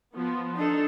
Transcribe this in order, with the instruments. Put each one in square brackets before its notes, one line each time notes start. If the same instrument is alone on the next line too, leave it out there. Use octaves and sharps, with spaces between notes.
[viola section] F3 B3
[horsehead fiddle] D4 A4 [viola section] D#4